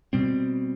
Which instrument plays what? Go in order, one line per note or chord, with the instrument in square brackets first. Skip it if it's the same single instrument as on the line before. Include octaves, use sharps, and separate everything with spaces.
[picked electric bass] B2 G3 C4